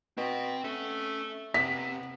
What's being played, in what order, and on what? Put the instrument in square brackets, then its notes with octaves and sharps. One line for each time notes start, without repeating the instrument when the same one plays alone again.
[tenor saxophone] B2 [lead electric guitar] C4 G5
[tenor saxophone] A3 [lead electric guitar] C#4
[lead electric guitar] C3 [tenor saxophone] B3 [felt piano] B6